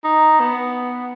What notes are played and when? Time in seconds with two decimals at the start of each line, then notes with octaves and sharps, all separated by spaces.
0.04 D#4
0.40 B3